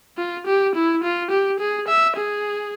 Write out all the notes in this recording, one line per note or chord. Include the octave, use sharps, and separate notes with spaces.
F4
G4
E4
F4
G4
G#4
E5
G#4